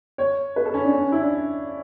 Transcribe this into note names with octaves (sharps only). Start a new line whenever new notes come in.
C#5
B4
A4
C#4
D4
C#4
E4
D4